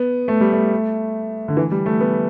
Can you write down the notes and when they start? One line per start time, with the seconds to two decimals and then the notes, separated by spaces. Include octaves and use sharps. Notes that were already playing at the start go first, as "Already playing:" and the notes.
Already playing: B3
0.28 A3
0.41 G3
0.53 A3
1.48 D3
1.57 E3
1.71 G3
1.86 A3
2.00 B3